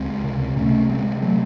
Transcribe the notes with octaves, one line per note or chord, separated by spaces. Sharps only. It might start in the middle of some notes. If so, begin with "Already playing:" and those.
Already playing: C#2 G#3 C4
C3
C3 A3 C#4
C3 G#3 C4
C3 F#3 A3